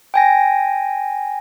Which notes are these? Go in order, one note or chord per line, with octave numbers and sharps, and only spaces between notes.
G5 G#5 A#6